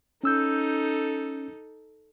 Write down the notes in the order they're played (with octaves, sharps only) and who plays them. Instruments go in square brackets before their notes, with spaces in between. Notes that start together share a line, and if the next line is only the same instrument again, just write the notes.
[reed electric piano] C#4 E6 G6 [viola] D#4 A4